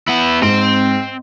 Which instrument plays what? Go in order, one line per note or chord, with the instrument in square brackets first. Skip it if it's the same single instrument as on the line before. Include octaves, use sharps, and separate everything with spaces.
[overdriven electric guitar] B3 E4
[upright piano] G#2 [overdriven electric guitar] C4 C6